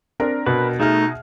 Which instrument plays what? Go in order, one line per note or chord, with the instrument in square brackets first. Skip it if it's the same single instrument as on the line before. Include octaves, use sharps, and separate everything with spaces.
[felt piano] C4 D4 A#4
[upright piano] B2 [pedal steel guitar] B4
[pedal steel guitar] A3 [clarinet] D#4 [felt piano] G#4 E5 F6